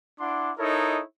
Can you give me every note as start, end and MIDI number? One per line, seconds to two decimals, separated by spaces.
0.20 0.52 62
0.20 0.52 64
0.20 0.52 78
0.20 0.52 84
0.20 0.52 86
0.58 1.01 63
0.58 1.01 64
0.58 1.01 69
0.58 1.01 70
0.58 1.01 73
0.58 1.01 75